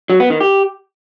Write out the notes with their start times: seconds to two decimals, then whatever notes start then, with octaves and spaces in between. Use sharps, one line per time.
0.10 F#3
0.20 B3
0.30 D#3
0.40 G4